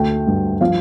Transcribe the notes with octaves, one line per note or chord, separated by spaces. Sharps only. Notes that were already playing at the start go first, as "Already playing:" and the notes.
Already playing: D2 A3 G5
G2
F3 F5